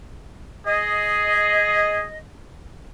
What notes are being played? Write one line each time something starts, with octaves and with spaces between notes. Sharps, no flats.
G#4 D#5